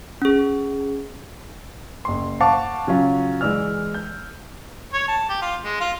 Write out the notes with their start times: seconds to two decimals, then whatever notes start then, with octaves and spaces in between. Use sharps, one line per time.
0.22 C#4 G#4
2.05 F#1 C6
2.40 C5 F5 F#5 A5 C#6 D6
2.87 C#3 F#3 C#4 F4
3.41 E3 G#3 E4 D5 E6 F6
3.94 G6
4.93 C#5
5.08 A5
5.29 G4
5.42 F4
5.64 G#3
5.81 F4